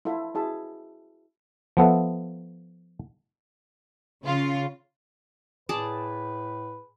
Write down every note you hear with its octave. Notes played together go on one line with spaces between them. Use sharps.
E4 F4 A4 E5
E4 F#4 G#4 E5 A5
F3 B3 A4 E5
C#3 F4
A2 G#4 B4 D5 A5